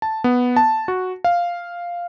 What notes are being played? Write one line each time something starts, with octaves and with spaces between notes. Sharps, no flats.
A5
B3
A5
F#4
F5